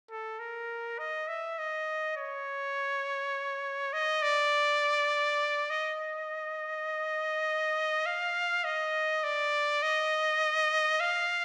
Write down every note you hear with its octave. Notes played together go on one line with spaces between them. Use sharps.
A4
A#4
D#5
E5
D#5
C#5
D#5
D5
D#5
F5
D#5
D5
D#5
F5